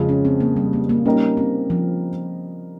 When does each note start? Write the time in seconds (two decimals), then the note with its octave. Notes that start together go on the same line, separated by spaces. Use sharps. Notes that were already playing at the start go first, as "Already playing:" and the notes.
Already playing: F2 C#3 F3 G#3
0.09 C#4
0.25 C4
0.40 A#3
0.56 G3
0.73 A#3
0.89 A#3
1.06 G3 A#3 C#4 D#4 A#4
1.37 C4
1.70 F3